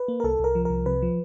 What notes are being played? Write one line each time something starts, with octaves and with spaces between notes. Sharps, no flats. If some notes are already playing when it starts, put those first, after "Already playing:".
Already playing: B4
A#3
A#4
C2 A4
C2
A#4
F3
C2 A#4
C3 B4
F3